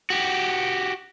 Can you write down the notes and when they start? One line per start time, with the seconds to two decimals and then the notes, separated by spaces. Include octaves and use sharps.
0.10 F#4 G4